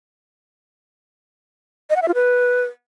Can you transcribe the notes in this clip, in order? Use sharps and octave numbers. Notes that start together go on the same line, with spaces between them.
D#5
F#5
E5
F4
B4